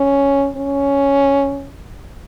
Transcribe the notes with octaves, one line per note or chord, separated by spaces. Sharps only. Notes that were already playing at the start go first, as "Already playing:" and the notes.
Already playing: C#4
C#4